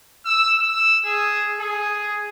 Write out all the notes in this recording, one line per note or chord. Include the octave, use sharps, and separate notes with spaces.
E6
E6
G#4
G#4